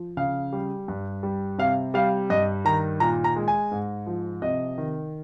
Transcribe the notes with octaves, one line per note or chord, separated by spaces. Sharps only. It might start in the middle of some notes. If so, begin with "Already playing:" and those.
Already playing: F3
C#3 F5
G3
G2
G3
C3 F5
G3 F5
G2 D#5
D#3 A#5
A#2 A#5
A#5
G#3
G#5
G#2
F3
C3 D#5
D#3